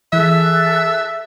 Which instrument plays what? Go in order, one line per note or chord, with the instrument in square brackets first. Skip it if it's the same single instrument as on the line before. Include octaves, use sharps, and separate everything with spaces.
[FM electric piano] E3 [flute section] G#4 A4 F#6 [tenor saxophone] E5